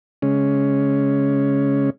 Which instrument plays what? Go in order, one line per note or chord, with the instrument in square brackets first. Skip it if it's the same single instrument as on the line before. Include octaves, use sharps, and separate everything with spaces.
[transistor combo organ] C#3 G#3 C#4